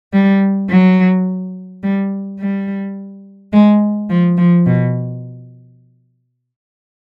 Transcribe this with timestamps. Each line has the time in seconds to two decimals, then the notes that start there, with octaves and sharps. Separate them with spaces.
0.13 G3
0.70 F#3
1.83 G3
2.39 G3
3.53 G#3
4.10 F3
4.38 F3
4.66 B2